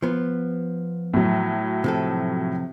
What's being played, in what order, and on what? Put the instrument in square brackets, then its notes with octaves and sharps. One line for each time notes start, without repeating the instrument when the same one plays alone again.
[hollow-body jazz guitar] F3 B3
[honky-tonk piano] A2 F#3
[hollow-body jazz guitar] C3 F3 A4